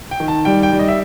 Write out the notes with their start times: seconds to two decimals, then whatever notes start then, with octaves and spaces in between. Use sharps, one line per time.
0.11 G5
0.20 D#3
0.28 A5
0.45 G3 G5
0.63 G5
0.72 G3
0.79 D#5
0.88 E5